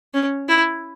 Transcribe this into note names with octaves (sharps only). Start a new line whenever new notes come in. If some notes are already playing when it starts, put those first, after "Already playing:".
C#4
E4